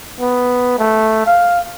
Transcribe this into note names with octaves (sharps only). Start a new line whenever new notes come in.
B3
A3
F5